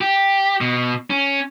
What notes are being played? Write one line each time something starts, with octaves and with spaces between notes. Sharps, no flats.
G4
B2
C#4